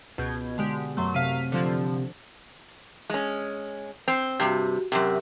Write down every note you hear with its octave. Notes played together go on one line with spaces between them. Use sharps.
C#2 B2 G6 G#6
D3 G#3 G4
F#2 F#3 A3 C6
C3 F5 B6 D#7
D3 F3
G#3 C#4
C4
G2 C3 F#4 G4
F#2 C3 G4 A#4